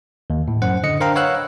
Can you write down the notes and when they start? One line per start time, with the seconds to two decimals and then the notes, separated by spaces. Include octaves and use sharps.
0.30 D#2
0.48 A2
0.62 F#2 C5 F#5
0.83 D3 D#5 C#7
1.00 D4 A#4 C5 F5 G5 A#5
1.15 B4 C#5 F5 F#5 E6 F#6